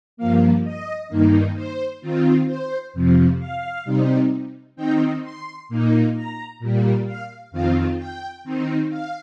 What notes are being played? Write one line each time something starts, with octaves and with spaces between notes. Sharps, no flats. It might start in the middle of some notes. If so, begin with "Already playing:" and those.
G2 F3 A#3 F5
D#5
G2 D#3 A#3 D#4
C5
D#3 C4 F4
C5
F2 C3 F3
F5
C3 G3 C4 D#4
D#3 C4 D#4 G5
C6
A#2 A#3 D#4
A#5
A#2 G3 A#3
F5
F2 D#3 C4 F4 F5
G5
D#3 C4 D#4
F5